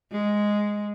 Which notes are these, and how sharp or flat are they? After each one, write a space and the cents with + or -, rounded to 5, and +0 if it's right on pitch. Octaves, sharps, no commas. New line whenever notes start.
G#3 +0